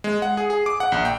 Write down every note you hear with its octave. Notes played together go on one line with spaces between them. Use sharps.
G#3
F#5
G#4
G#4
D6
F#5
A#1
G5